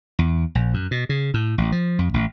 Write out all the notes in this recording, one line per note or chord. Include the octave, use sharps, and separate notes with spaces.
E2
A#1
F#2
B2
C#3
A2
A1
F3
F2
A1